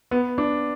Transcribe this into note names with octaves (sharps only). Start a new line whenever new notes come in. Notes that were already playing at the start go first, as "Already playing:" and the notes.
B3
D4